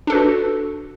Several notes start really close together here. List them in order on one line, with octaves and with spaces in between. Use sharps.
D4 A4 B4 F#4